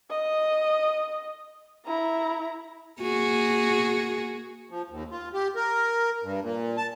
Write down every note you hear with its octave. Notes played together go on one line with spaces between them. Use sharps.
D#5
E4 A#5
A#3 F#4 G#4
F3
D#2
F4
G4
A#4
G2
A#2
A5